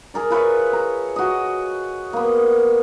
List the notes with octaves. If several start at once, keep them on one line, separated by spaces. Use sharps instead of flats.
G#4 A#4 D5
F4 B4 C#5 E5
A#5
F#4 D#5
A#3 B3